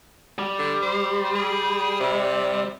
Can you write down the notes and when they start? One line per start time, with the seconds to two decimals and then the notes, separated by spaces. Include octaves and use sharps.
0.39 G3
0.59 D3
0.82 C5
1.35 G#4
2.00 C3